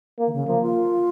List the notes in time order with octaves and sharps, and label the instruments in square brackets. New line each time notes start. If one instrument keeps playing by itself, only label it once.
[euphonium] A#3
[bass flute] D#3
C#3
[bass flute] F3 [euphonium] A#3
[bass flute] F4